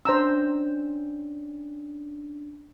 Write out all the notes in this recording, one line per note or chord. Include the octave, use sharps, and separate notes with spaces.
C#4 D4 C5 A#5 E6